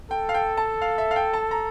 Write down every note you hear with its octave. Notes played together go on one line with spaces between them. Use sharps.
A4 G5
F5
G5
A5
F5
E5
F5
G5
A5
A#5